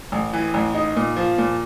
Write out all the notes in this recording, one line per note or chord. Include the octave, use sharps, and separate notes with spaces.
A1
E3
A1
D#4
A#2
F3
A#2